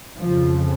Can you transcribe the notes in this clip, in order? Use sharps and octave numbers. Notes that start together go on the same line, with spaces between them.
F2 C#3 F3